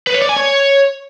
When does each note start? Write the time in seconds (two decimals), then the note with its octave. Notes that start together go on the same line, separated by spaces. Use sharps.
0.07 B4
0.14 C#5
0.22 D5
0.29 G#5
0.37 C#5